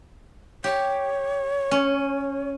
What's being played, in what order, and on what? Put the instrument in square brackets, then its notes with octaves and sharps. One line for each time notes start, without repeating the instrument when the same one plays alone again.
[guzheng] G4 [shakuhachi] C#5
[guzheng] C#4